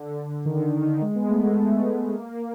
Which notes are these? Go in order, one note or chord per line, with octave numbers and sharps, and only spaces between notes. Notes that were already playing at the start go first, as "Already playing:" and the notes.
Already playing: D3
D#3
D#3
D#3
G#3
B3
A3
G#3
A3
A#3